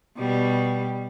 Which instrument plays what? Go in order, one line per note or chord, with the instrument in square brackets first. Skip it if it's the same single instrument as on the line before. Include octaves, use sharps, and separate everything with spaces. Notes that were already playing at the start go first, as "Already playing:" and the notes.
[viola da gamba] B2 G3